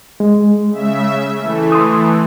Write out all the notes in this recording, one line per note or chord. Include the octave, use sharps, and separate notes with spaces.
G#3
C#3 E5
E3 A3
C6 D#6